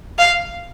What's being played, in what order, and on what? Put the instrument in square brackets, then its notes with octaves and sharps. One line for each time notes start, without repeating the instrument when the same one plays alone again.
[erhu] F5